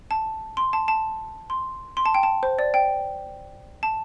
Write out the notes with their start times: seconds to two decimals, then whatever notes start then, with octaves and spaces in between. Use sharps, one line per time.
0.11 A5
0.57 C6
0.73 A5
0.88 A5
1.50 C6
1.97 C6
2.06 A5
2.15 G5
2.23 A5
2.43 C5
2.59 D5
2.74 G5
3.83 A5